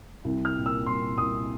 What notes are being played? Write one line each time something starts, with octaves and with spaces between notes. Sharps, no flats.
C2
F6
A#2
E6
C2 C6
C2 D#6